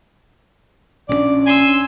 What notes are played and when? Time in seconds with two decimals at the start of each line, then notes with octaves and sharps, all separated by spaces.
1.09 A#1 C#3 C#4 D4 D5
1.46 G#5 C6 E6